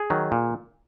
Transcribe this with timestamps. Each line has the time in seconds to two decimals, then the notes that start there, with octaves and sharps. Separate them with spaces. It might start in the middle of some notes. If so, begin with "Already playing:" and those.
Already playing: G#4
0.10 D#3 F#3
0.32 A#2